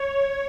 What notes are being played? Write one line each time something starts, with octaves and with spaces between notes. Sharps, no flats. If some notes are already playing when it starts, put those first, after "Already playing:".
Already playing: C#5